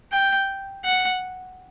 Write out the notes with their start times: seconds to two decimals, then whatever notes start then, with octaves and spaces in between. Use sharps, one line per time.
0.12 G5
0.85 F#5